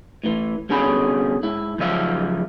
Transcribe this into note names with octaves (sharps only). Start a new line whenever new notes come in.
A2 E3
C2 B2 D3 C#4 G#4 B5
G#2 E4
F#2 C#3 F3 E5 F5